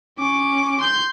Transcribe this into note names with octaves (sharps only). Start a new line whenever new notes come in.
C#4 D6
C6 G6